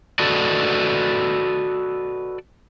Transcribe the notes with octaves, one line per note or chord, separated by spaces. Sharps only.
F#4 A4 B4 D5 D#5